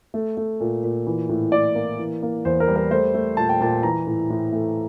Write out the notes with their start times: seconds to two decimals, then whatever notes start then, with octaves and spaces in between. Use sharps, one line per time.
0.14 A3
0.37 A3
0.60 A#2
0.84 A#2
1.06 E3
1.29 A2
1.52 A2 D5
1.75 A#3
1.99 E3
2.22 A#3
2.45 E2 C5
2.60 A#4
2.68 G3
2.76 A#4
2.91 A3 C5
3.14 A3
3.37 A#2 A5
3.49 G5
3.61 A#2 A5
3.83 E3 A#5
4.07 A2
4.30 A2
4.53 A3